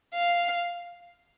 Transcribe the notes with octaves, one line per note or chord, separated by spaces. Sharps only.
F5